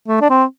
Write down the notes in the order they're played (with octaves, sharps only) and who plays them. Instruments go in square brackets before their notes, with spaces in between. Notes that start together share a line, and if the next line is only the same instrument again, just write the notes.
[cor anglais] A3
D4
C4